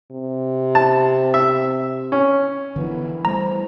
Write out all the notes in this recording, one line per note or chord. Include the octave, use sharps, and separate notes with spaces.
C3
A5
E5
C#4
D3 E3 F3 B3 D4
G3 A3 C5 A#5